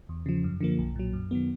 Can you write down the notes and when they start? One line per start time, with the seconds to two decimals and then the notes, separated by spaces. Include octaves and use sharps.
0.09 E2
0.26 C#3 F3
0.44 F#2
0.61 D3 F3 A#3
0.79 B1
0.96 A#2 F#3
1.13 F#2
1.31 D#3 F#3 B3